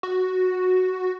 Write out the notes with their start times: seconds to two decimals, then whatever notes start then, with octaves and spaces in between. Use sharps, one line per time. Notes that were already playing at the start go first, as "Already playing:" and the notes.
0.03 F#4